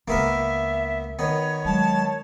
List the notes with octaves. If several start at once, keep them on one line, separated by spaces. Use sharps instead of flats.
C#2 G#3 A#3 B3 A#4 E5
D#3 B3 C#5
F#3 G#3 A5